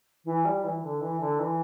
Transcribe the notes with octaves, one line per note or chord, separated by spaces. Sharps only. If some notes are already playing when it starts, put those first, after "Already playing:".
E3
G3
E3
D3
E3
D3
E3